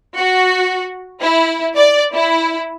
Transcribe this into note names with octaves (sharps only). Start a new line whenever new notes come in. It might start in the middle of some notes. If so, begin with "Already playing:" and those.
F#4
E4
D5
E4